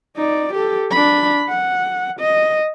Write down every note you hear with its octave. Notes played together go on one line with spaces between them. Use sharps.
D#4 D5
G4 A4
D4 B5
F#5
D#5